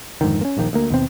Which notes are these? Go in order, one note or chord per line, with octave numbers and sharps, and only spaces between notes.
F2 G#2 D3 D#3
A#3 C#4
D#1 A#1 D#2 D#3
D2 A#3
D#2 B2 C4